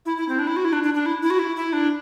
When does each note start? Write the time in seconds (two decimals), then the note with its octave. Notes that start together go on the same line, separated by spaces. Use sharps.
0.06 E4
0.17 E4
0.29 C4
0.39 D4
0.47 E4
0.56 F#4
0.65 E4
0.73 D4
0.83 D4
0.94 D4
1.06 E4
1.22 E4
1.30 F#4
1.39 E4
1.56 E4
1.73 D4